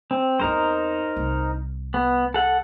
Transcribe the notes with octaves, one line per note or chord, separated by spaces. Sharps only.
C4
E2 C4 D#4 A#4 C5
C2
B3
A4 F#5